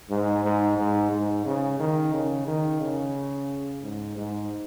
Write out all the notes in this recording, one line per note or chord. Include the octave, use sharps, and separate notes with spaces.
G#2
G#2
G#2
G#2
C#3
D#3
C#3
D#3
C#3
G#2
G#2